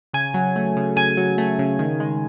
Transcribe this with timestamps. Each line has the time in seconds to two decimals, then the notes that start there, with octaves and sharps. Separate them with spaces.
0.14 C#3 G#5
0.34 F#3
0.56 A3
0.76 C#3
0.96 C#3 G#5
1.17 F#3
1.38 A3
1.59 C#3
1.79 D#3
2.00 G#3